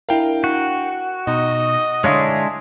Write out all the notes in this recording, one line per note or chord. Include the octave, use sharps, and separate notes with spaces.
D4 E4 A#4 F5 G5
F#4
B2 D#4 D#5
D3 G#3 D4 E4 C#5 F5 C6 D#6